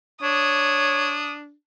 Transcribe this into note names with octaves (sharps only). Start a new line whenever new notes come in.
D4 C#5 D#6